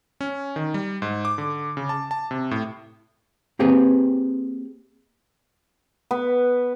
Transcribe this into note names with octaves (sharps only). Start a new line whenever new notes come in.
C#4
D#3
G3
G#2
D6
D3
C#3
A5
A5
C3
A2
A#3 C4 G4 G#4 B4
B3